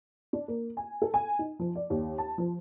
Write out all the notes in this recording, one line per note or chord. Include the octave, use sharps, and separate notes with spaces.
D4
A#3
G#5
A4
G#5
D#4
F3
D5
D#2
A5
F3